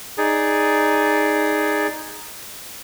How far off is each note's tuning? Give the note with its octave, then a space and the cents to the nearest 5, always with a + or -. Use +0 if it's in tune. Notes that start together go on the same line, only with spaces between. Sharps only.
D#4 +0 G#4 +0 D5 -5